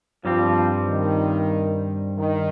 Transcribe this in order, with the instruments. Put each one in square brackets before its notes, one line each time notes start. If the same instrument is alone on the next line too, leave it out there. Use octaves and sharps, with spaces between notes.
[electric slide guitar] G2 G3 C4 [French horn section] F3
[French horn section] D#3
D#3